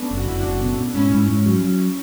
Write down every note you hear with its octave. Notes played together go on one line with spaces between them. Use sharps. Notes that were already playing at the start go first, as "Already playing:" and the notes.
Already playing: A3 B3 C#4 D4
F#1
F#4
F#1 E4
F#1 D4 F#4
B2
B2
G#2 C#4 E4
G#2
G#2
F#3
F#3